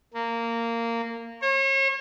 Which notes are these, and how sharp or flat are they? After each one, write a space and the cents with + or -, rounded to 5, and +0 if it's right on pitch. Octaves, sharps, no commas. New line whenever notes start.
A#3 -15
C#5 -40